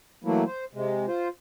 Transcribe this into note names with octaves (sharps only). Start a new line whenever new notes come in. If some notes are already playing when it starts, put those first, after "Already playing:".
E3 F#3 A3 A#3 E4
C5
C3 G#3
F4 C5